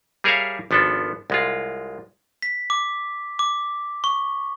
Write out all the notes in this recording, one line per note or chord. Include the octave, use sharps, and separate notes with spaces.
G3 G#4 A#4 C#5 E5 F5
G#1 F3 B3 D4 A4
C2 G#3 F4
B6
D6
D6
C#6